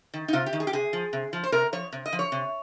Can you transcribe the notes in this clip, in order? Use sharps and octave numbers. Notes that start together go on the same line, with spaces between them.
D#3
D#4
C3 F4
G4
D#3
G#4
G4
C3 G#4
F3
C3
F3
C5
C3 A#4
F3 C#5
C3
D#5
F3
C#5
C3